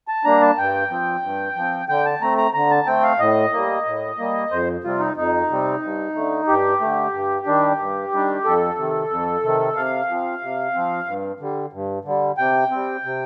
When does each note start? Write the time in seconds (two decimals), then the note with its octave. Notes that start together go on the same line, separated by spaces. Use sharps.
0.08 A5
0.24 G3 A#3 D4 A#5
0.41 A5
0.58 G2 G5
0.90 F3 C4
1.23 G2
1.56 F3 C4
1.89 D3 G5
2.06 A5
2.21 A3 C4 A#5
2.38 A#5
2.54 D3 A#5
2.71 A5
2.86 A3 C4 G5
3.03 F5
3.19 A2 D#5
3.53 G3 A#3
3.86 A2
4.18 G3 A#3
4.51 F2 C5
4.84 C3 G3 C4 F4
5.00 D#4
5.16 F2 D#4
5.50 C3 G3 C4
5.82 G2
6.15 D3 A3
6.47 G2 G4
6.81 D3 A3
7.14 G2
7.46 D#3 G3 D4
7.79 G2
8.12 D#3 G3 D4
8.44 F2 A4
8.77 C3 D#3
9.10 F2
9.43 C3 D#3
9.76 C3 F5
10.09 F3 C4
10.42 C3
10.74 F3 C4
11.07 G2
11.40 D3 G3
11.73 G2
12.05 D3 G3
12.38 C3 G5
12.71 G3 C4
13.04 C3